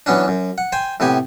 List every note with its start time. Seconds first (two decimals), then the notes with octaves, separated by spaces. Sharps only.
0.06 E3 F#3 B3 C#4 D4
0.28 F#2
0.58 F#5
0.72 C5 G5 G#5
1.00 A2 C3 B3 G4 G#5